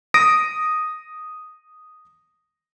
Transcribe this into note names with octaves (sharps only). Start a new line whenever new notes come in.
D#6 A#6 D7